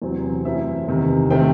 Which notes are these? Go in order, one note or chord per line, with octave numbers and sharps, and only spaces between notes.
E2 C3 F#3 C4
F#2 E3 A3 C4 E5
E2 C3 D#3
C3 D#3 A3 C4 G5